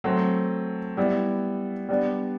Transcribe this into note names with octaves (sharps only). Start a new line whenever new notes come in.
F#3 A3 C4
G3 B3 E4
G3 B3 D4